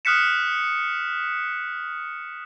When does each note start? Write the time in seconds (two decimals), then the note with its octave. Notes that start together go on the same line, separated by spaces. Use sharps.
0.05 D#6 F6 F#6 B6 C#7 E7